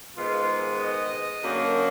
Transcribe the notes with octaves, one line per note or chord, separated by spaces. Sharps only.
G#2 D#3 G#3 B3 F4
D#5
F#2 D3 F#3 A#3